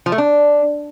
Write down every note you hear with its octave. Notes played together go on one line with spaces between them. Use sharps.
F3
A3
D4